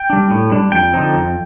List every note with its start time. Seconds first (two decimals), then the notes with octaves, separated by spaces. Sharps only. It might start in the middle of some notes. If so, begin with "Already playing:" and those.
Already playing: G5
0.10 G3 D4
0.31 A2
0.51 G3 D4
0.72 F2 G5
0.93 D3 F3 C4 D#4
1.14 F2